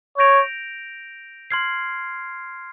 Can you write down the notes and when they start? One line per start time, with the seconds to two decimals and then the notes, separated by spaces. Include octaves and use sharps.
0.18 C#5 G6 A#6 D7 F7
1.51 C6 F6 G#6 C7